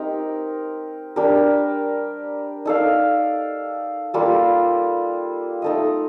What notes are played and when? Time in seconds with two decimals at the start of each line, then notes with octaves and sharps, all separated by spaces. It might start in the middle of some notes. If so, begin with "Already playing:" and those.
Already playing: C4 D#4 G4 A#4
1.16 G3 D4 G4 A#4
2.65 D#4 A4 D5 F5
4.14 G3 A#3 F4 A4
5.62 A3 D#4 A4 D#5